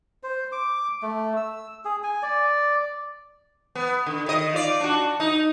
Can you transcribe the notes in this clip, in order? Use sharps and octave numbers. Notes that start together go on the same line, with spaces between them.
C5
D6
A3
E6
G#4
G#5
D5
B3
D3
D#3 D#5
F4 D5
D4 F#4
D#4